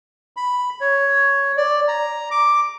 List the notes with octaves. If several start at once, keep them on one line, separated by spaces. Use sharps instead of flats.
B5
C#5
D5
A#5
D6